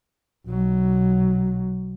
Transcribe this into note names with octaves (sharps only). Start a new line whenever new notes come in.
B1 F#3